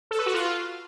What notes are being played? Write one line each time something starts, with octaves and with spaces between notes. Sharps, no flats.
A4
B4
F#4
F4